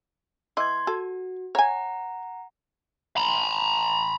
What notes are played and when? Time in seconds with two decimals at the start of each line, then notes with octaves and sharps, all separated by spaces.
0.57 E3 D#5 C6 G#6
0.87 F#4 A4
1.55 C#5 F#5 G#5 A#5
3.17 A#5 B5